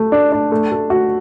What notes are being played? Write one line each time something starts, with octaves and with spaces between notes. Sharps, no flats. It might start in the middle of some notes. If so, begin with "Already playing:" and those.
Already playing: A3
D4
D4
A3
A4
F#4